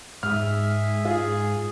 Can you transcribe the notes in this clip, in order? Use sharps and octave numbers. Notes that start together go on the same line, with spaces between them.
G#2 G#4 E5 F6
F4 G#4